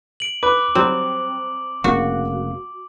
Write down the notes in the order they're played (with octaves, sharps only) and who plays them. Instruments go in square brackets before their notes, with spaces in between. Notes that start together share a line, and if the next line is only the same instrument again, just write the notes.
[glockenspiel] D7 F#7
[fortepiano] B4 [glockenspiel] D6
[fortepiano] F#3 G3 [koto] C4
[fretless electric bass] F1 C#3 A#3 [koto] F#4